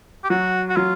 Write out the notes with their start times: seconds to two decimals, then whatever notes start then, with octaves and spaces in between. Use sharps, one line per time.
0.24 G4
0.30 F#3 F#4
0.69 F#4
0.77 F#3 F4